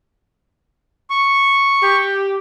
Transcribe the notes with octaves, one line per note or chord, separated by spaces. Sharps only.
C#6
G4